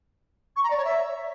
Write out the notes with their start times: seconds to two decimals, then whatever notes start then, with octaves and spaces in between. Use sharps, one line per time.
0.56 C#6
0.63 A#5
0.71 D5
0.78 C#5
0.85 E5